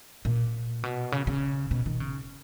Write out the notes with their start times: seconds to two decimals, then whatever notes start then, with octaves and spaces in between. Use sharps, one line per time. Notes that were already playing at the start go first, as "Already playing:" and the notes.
0.25 A#2
0.83 B2
1.12 C#3
1.27 C#3
1.71 B2
1.86 D#3
2.00 C#3